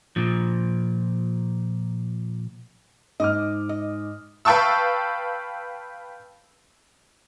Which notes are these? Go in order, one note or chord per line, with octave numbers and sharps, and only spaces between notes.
A#2 F3
G#2 D#5 D6 F6
D#5
B4 F5 G5 A5 C#6 E6